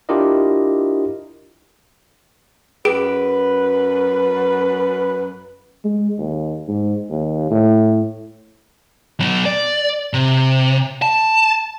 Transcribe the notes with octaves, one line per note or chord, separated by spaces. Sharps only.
D4 E4 F4 G4 A#4 D#5
F#2 G#4 B4 D7
G#3
D#2
G#2
D#2
A2
F#3 B3
D5
C3
A5